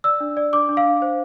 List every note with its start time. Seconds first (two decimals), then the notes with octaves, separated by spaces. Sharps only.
0.04 D5 E6
0.20 D4
0.37 D5
0.53 D4 D6
0.69 D4
0.77 F5
0.85 D4
1.02 C5